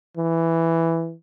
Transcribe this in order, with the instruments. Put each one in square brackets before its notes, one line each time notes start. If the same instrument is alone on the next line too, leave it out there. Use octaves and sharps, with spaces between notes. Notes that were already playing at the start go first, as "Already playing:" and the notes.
[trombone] E3